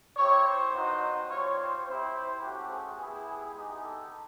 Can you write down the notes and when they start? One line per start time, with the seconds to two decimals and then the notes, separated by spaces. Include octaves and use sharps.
0.17 C4 E4 G4 C#5
0.45 C5
0.74 B3 D#4 F#4
1.29 G3 C4 F4 C#5
1.58 C5
1.86 C4 E4 G4 C5
2.41 A3 C#4 F#4 G4
2.69 G#4
2.98 B3 E4 G4 G#4
3.26 G#4
3.54 G#3 B3 D#4 G4 G#4
3.82 A4